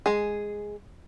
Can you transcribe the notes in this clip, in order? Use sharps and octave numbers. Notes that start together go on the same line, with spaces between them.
G#3 G#4